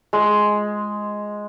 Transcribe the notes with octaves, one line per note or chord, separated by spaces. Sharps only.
G#3